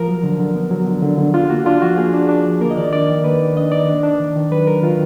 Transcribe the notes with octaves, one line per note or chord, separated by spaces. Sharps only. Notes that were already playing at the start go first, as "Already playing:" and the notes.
Already playing: F3 A#4
F#3
D3
D3
B3
F#3
D3
D3
D3
D4 F4
A#3 F#4
D4 F4
F3 F#4
A#3 G#4
D4
D4
F3
A#3 A#4
D#5
D#3 D5
D4 D5
D#3
A#3 B4
D#3
D4 D#5
D#3 D5
D4
D4
D#3
D#3
F#3 B4
F#3 A#4
D#3 F4